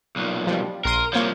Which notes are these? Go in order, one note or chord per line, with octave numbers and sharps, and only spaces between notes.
B1 A#2
F3 G3
A#1 A#4 C6 D#7
C2 F3 A#3 C#5